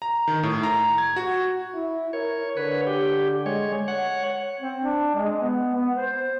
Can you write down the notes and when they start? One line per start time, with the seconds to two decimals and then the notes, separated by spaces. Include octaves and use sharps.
0.02 A#5
0.28 D#3
0.43 A2
0.63 A#5
0.98 G#6
1.16 F#4
1.74 E4
2.13 A#4 C#5
2.57 D3 B4 C#5
2.87 G4
3.46 G#3 C#5
3.88 C#5 F#5
4.60 C4
4.83 D4
5.15 G#3
5.41 B3
5.75 B3
5.96 C5